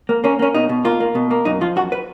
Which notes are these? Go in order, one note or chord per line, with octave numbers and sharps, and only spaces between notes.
A#3
A#3 C#4
A#3 C#4
B2 D#4
B2
A#3 F4
A#3
B2
A#3
F#2 D#4
F3 F4
F#2 F#4
B4